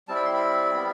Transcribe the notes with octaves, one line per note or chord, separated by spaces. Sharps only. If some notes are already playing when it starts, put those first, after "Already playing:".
G3 C4 E4 A5
B5
C6
B5
G3 B3 E4